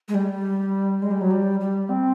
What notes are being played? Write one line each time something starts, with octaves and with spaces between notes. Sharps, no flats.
G#3
G3
G#3
G3
F#3
G3
G3
C4